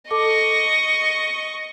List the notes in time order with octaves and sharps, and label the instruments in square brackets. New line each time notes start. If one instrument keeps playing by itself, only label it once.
[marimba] A4 A5 D6 [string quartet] D#5 C#6